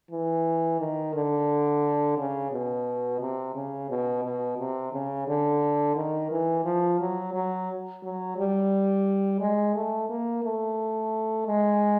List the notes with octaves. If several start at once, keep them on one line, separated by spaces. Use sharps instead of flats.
E3
D#3
D3
C#3
B2
C3
C#3
B2
B2
C3
C#3
D3
D#3
E3
F3
F#3
F#3
F#3
G3
G#3
A3
A#3
A3
G#3